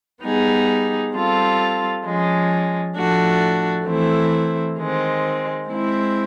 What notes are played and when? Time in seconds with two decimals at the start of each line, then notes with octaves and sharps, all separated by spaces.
0.24 G3 B3 D#4 G#4
1.14 G3 C4 F4 A4
2.05 F3 G#3 C#4
2.96 A2 F3 A3 D4 F#4
3.87 E3 A3 C4 E4
4.77 D#3 G#3 C4
5.68 G#3 C4 E4